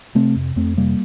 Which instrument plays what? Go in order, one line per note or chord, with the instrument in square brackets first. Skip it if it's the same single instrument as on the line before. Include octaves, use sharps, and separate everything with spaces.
[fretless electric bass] C3 A3 C4
F2
F2 A3 C4
C3 G3 A#3